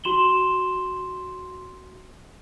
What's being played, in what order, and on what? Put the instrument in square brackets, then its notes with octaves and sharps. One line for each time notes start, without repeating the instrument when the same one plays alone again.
[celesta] F#4 C6 E7 F#7 G7